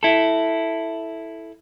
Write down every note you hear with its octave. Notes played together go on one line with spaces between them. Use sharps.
E4 A4